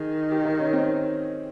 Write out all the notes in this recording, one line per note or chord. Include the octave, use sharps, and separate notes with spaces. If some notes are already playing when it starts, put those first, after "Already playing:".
Already playing: D#3 G#4
G4
D#4
C#4
C4